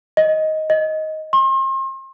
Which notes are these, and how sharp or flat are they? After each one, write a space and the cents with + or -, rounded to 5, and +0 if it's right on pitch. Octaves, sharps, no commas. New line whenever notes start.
D#5 +10
D#5 +10
C6 +40